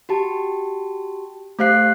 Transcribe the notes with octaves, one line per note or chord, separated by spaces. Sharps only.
F#4 G4 A5
A3 G4 C5 F5 F#6 C7